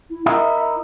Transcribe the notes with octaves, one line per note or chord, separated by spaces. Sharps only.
E4
E4 A#4 D#5 E5